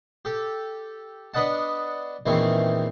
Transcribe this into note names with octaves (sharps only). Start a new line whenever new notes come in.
G4 A4
B3 D4 B4 D#5 F#5 A5
E2 A#2 D#3 E3 C4 C#4